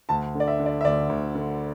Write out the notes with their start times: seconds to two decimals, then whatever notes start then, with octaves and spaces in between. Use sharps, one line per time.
0.09 D2 A5
0.35 D3 D5
0.48 E5
0.60 D3
0.66 D5
0.81 E5
0.84 D2 D5
1.09 D2
1.35 D3